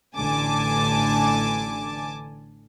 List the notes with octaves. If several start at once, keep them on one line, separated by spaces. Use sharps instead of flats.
A1 D3 G#5 A5 D6